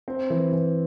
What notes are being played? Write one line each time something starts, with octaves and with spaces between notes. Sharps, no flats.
C4
E3
E3